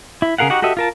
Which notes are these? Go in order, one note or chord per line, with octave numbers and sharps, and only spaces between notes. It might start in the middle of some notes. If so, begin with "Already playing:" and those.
E4
C#3 G#4 A#4 F5 F#5
D#4 F#4 G4 F#5
F#4 G4 A4 D#5 E5
F4 A#4 A5